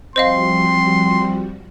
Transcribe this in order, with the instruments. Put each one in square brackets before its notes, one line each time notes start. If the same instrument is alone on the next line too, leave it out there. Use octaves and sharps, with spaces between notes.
[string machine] F3 G3 F#4 [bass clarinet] C4 [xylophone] C5 D#5 F5 [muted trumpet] C6